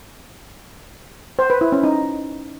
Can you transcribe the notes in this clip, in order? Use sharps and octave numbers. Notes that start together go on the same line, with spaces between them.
C5
B4
E4
C#4
D#4